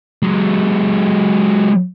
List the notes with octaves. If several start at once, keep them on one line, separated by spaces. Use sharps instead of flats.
F#3 G#3